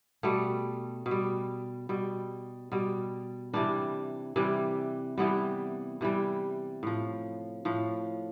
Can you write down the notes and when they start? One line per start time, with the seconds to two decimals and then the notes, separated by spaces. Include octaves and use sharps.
0.23 B2 G3 A3
1.06 B2
1.11 G3
1.89 B2 G3
2.72 B2 G3
3.53 C3 E3 G3 D4
4.36 C3 E3 G3
5.18 C3 E3 G3 B3
6.01 C3 E3 G3
6.83 A2 F3
7.65 A2 F3